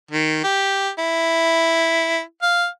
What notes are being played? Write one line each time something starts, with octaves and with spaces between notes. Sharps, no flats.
D#3
G4
E4
F5